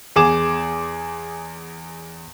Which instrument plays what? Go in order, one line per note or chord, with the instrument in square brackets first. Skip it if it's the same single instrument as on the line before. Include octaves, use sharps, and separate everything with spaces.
[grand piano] E2 G#4 D6 E7